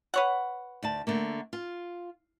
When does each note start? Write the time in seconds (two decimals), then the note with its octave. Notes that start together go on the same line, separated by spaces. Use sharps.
0.14 B4 C#5 F#5
0.82 D2 D5 A5
1.07 D3 A3 A#3
1.53 F4